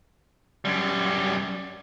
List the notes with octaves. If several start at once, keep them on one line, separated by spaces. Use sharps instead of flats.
F#2 G3